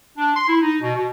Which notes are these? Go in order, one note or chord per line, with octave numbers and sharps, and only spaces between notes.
D4
C6
E4
D#4
B2
B2